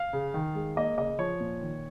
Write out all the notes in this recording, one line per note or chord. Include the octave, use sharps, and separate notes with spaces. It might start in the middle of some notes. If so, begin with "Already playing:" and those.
Already playing: F5
C#3
D#3
G#3
A#3 D#5
C#3 D#5
F3 C#5
A#2
D#3